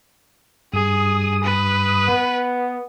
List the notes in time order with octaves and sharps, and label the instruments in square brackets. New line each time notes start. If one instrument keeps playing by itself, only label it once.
[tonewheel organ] G2 D#6 [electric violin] G#4
[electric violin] B4
[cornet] B3